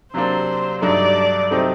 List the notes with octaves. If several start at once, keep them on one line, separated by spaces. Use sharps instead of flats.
C3 F#3 A#3 D4 C5
G2 F#3 A3 D#4 D5
C3 F#3 A3 C4 D#4